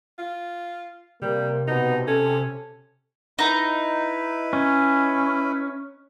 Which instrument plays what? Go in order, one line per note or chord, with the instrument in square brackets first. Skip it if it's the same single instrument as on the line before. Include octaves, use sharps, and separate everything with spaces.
[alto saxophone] F4
[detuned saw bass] C3 [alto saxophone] G3 [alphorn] A#3
[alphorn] B2 [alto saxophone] D#4
[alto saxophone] C#4 [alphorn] A4
[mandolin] D#4 A#5 [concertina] E4 B4
[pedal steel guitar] C#4